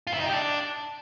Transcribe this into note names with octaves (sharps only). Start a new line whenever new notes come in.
F4
E4
D#4
G4
D4